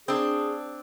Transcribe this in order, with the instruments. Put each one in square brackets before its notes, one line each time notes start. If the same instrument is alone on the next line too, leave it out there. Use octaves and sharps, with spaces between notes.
[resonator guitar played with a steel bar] C4 D4 [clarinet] G#4